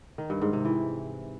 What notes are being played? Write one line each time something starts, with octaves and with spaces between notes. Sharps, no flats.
D#3
G2
G#2
C3
E3